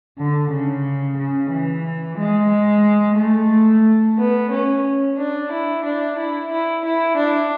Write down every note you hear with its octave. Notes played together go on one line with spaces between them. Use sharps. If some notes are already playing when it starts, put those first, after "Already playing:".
D3
C#3
C#3
E3
G#3
A3
B3
C#4
D4
E4
D4
E4
E4
E4
D4